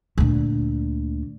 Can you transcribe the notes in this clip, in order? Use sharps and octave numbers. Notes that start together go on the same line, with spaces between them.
D2 A#2